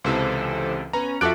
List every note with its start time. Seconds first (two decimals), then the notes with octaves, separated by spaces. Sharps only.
0.04 C#2 C3 E3 A4 C5
0.93 B3 C#4 A#5
1.21 F2 F4 F#4 A4 E5 D6 F#6 D7